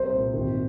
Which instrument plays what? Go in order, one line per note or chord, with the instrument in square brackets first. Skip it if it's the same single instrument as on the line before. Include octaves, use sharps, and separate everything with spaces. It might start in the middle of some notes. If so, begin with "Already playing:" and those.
Already playing: [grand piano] C2 C3 [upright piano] C5
[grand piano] A#2
G#1